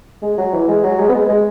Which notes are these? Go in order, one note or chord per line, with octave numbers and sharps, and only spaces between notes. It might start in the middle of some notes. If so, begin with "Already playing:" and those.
G#3
F#3
E3
G#3
F#3
G#3
B3
G#3
G#3